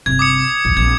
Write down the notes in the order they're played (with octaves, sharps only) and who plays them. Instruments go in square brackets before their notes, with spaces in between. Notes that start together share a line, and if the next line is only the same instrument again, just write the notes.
[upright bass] G1 C3 [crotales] G#6
[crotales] D6 D#6 C#7
[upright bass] A#1 D#2
[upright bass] A#1 C4 [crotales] G#6